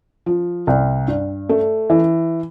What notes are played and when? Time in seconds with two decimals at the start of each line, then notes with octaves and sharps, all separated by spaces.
0.26 F3
0.67 C2
1.08 G2
1.49 A3
1.90 E3